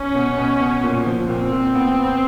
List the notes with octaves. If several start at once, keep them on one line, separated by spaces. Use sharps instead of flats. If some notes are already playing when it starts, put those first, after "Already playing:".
Already playing: C#4
B2
B2
B2
A#2
F3
A#2 C4
A#2
B3
B3